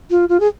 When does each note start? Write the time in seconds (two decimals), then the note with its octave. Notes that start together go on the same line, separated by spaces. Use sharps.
0.10 F4
0.29 F4
0.40 G#4